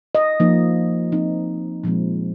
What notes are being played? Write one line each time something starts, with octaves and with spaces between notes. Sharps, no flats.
D#5
F3 A#3 D#4
F3 C4 D#4
A#2 F3 G#3 C4